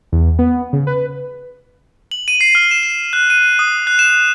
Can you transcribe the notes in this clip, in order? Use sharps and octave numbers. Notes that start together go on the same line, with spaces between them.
E2
B3
C#3
B4
F#7
D#7
C7
F6
E7
E7
F#6
D#7
D#6
F#6
E7